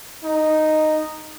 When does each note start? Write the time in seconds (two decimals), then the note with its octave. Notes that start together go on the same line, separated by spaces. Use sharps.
0.23 D#4